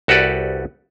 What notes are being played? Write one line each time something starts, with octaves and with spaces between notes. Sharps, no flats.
C2 F#4 G4 A4 B4 D5